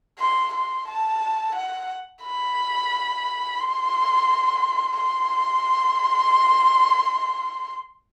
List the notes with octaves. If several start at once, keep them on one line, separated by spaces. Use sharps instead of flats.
C6
C6
A5
F#5
B5
C6
C6